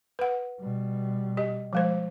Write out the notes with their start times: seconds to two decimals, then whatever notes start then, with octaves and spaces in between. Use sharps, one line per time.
0.19 B4 F#5
0.60 B2 G3
1.37 G4 D#5
1.73 F3 G#3 C5